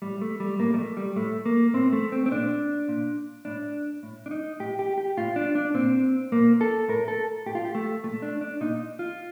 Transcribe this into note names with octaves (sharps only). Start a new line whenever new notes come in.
A2 G3
A3
G3
A2 A#3
G3
A3
G3
A2 A3
A#3
A2 C4
A3
C4
C4
A#2 D4
A#2
A2 D4
A2
D4
D#4
A2 G4
G4
G4
A2 F4
D4
D4
A#2 C4
A#2 A#3
A4
A2 A#4
A4
A2 G4
F4
G4
A3
A#2 A3
D4
D4
A#2 D#4
F4